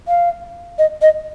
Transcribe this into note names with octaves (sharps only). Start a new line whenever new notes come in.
F5
D#5
D#5